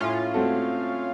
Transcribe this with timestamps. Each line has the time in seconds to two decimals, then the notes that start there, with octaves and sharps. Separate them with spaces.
0.01 A2 C#4 F4
0.34 A3 C4 F#4 A4